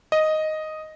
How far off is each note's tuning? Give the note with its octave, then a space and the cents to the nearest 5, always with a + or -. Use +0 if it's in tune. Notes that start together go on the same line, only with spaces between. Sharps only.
D#5 +0